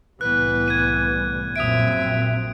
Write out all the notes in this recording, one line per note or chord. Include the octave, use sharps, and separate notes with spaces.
C2 A2 E3 G3 B3 B4 F#6
G#6 D#7
A#1 F#2 A#2 C4 E5 D#6 D7